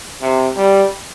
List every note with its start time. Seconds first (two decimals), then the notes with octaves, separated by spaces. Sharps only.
0.21 C3
0.57 G3